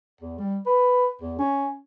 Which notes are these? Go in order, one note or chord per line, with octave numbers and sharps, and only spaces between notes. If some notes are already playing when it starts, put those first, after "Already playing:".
E2
G3
B4
E2
C#4